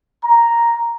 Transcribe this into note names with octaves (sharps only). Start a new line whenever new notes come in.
A#5